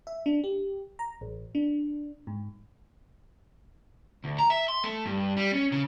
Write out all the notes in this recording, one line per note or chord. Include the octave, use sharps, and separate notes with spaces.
E5
D4
G4
A#5
A1
D4
G#2
D2
A#5
E5
C6
A3
G2
G3
C#4
C#3